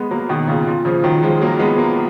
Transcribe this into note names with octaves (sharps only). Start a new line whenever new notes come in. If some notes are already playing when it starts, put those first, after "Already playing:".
Already playing: G#3 B3
F#3 A#3
B2 D#3
A#2 C#3
A#2
C#3 F3
D#3 F#3
F3 G#3
F#3 A#3
G#3 B3
F#3 A#3